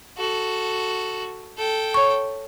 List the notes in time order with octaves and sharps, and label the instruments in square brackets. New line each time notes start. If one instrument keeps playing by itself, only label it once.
[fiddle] F#4 A4
A4 G5
[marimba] C#5 C#6